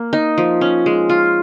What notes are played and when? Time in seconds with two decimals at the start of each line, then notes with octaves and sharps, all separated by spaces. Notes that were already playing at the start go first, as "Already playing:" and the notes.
Already playing: A#3
0.13 D#4
0.38 F3
0.61 C#4
0.86 G#3
1.09 F4